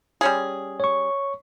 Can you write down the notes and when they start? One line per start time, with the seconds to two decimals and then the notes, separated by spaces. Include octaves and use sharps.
0.21 G3 C#4 G#4
0.80 C#5 C#6